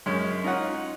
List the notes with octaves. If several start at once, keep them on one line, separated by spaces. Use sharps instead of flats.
F#2 G#3 C#4
C#4 D#4 F4 C#5 F#5